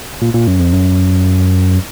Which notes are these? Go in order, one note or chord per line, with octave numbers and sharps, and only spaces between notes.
A#2
A#2
F#2
F2
F#2